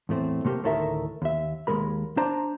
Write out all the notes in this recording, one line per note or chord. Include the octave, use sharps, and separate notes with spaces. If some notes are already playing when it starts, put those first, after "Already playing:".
E2 A2 A3 C4
C3 A3 A#3 G4
D2 A2 D#3 A4 A#4 E5
D#2 E5
D#2 F3 G#3 A#4 B5
D4 C5 D5 A5 A#5